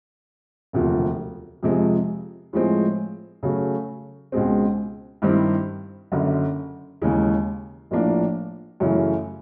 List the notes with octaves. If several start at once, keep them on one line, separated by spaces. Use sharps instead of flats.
E1 D2 C3 F3
F2 C3 F3 G#3
A2 F3 G#3 C4
C#3 F#3 A3
C#2 B2 G#3 C4
G2 D#3 G3 C4 E4
F#1 F#2 D3
D#2 C#3 E3 G#3
A#1 A2 F3 A#3 D4
F#2 C#3 E3 A3